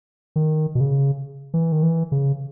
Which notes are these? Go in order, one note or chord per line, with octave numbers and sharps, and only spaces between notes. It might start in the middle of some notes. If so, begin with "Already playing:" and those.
D#3
B2
C#3
E3
D#3
E3
C#3